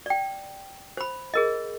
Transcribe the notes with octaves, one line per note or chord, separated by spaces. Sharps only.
D5 G5
C5 B5
G#4 A#4 D#5